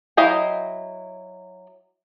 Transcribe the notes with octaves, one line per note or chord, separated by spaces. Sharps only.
F#3 E4 D#5 F5 G5